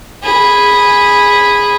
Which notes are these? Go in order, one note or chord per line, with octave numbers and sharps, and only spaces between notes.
G#4 B5